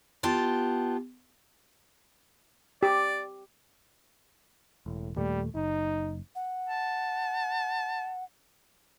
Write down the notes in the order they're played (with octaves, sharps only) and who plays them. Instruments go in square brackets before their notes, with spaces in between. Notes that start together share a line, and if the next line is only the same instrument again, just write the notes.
[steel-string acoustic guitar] B3 F4 G4 A5
[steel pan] G4 [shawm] D5
[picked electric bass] E1 [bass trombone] A2
[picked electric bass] D#2 A#2 A3 [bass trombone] G3
[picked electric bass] F#1 [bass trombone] D#4
[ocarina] F#5
[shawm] A5